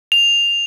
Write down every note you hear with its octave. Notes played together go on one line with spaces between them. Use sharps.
F7